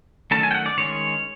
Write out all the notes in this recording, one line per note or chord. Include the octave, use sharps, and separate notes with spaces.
D#3 F#3 A3 C#4 A5
G#5
G5
F#5
D5
D#3 G#3 C#4 C#5